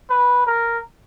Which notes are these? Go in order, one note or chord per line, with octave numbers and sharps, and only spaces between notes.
B4
A#4